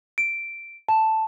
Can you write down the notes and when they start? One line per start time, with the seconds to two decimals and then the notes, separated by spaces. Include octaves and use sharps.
0.18 D7
0.88 A5